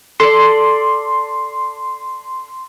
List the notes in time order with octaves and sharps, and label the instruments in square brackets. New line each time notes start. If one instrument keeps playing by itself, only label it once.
[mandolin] A4 D5 [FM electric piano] C6